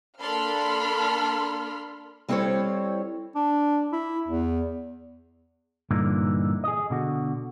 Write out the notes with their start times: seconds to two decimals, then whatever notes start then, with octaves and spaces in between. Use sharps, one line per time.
0.21 A#3 D4 A4 B5 C6 F6
2.29 G3 C4 E4 A4 C5 C#5
3.35 D4
3.92 E4
4.28 E2
5.91 G2 A#2 D3 E3 D#4
6.64 G#4 D#5
6.90 B2 D3 F#4